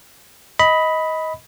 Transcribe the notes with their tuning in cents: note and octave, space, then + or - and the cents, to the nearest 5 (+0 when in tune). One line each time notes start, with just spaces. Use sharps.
D#5 +20 B5 +0